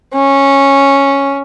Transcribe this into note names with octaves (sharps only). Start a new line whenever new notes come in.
C#4